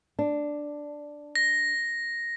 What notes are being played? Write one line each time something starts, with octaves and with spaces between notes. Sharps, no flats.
D4
A#6